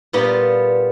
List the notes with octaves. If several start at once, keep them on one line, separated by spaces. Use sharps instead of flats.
A#2 G3 B3 F4